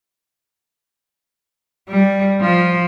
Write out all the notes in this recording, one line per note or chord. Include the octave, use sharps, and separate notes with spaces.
G3
F3